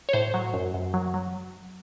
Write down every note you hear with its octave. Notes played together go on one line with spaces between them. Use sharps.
C#5
A2 C5
F#3
F#2
F#2
F#3
F#3